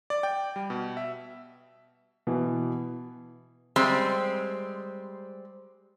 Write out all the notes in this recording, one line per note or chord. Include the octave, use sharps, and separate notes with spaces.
D5
G5
G3
B2
E5
B2 E3
G3 G#3 C4